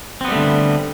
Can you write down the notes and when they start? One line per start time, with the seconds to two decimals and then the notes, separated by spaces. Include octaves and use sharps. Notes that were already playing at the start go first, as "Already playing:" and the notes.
0.21 C4
0.25 B3
0.28 G3
0.32 A3
0.36 D3